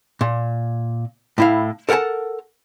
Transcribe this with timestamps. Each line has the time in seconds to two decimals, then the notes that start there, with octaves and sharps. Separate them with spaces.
0.21 A#2
1.38 A2 E4 F5
1.89 A4 A#4 F#5 G5 A5